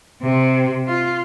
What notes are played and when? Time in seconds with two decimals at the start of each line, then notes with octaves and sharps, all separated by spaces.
0.22 C3
0.87 F4